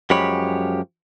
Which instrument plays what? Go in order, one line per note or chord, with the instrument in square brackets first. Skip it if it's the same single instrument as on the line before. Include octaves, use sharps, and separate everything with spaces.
[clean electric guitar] F#2 F3 G#3 G4 C#5 B5